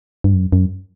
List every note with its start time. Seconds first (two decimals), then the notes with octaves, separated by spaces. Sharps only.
0.24 G2
0.33 F#2
0.52 F#2